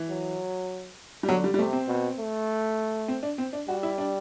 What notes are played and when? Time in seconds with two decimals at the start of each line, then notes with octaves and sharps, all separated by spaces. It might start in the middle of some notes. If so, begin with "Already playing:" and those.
Already playing: E3
0.09 F#3
1.23 G3
1.29 D3 F#3
1.44 G3
1.54 G3
1.58 C3 A3
1.73 C4
1.88 B2
2.19 A3
3.08 C4
3.23 D4
3.38 C4
3.53 D4
3.68 G3 F#4
3.83 E4
3.98 D4